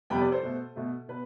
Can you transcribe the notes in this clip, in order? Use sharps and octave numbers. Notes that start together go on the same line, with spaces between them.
F2 C3 G3 B3 G5 B5
B4 D5
A4 C5
B2 A3
B2 A3
B2 B4